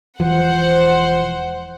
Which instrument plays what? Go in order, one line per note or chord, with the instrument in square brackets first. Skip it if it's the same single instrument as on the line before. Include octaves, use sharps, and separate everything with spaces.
[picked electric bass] E1 E3 F3 [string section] C5 F#5